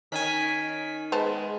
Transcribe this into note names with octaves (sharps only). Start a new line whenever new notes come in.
D#3 C#4 G#5 B6
G#3 B3 C5 A5